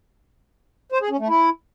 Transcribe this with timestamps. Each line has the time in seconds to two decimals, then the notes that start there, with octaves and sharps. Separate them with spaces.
0.92 C5
1.01 G#4
1.10 C#4
1.19 A3
1.28 E4